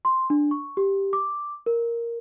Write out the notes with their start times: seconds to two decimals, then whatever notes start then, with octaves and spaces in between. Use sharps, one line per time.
0.05 C6
0.30 D4
0.51 C#6
0.77 G4
1.13 D6
1.66 A#4